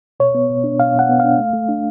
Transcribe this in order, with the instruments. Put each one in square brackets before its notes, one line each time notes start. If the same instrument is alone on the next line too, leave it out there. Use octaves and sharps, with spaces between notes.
[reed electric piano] B2 C#5
B3
B2
D4
B2 F5
B2 F#5
B3
D4 F5
A3
A3
D4